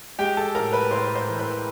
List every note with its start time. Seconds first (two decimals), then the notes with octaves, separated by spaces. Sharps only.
0.18 G#3 G4 G5
0.37 A4 A5
0.55 A2 A#4 A#5
0.73 B4 B5
0.91 A2 C5 C6
1.15 C5 C6
1.27 E3
1.39 B4 B5